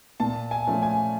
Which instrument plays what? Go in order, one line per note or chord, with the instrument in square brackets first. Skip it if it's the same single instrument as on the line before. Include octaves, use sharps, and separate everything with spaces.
[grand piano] A#2 A5
G#5
F3 A3 C#4
G#5